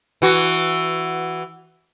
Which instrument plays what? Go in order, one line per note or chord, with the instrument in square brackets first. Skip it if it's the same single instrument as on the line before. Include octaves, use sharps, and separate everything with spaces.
[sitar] E3 F#4